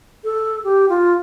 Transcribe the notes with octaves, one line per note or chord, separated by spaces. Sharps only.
A4
G4
F4